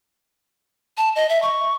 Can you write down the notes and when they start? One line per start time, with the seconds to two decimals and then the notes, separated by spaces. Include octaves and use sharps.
0.97 A5
1.16 D#5
1.29 E5
1.42 C#6